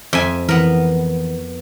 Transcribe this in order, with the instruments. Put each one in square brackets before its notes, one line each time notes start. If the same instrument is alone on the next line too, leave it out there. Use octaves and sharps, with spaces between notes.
[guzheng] F2 E5 G#5
[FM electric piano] E3 [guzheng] B3 A#4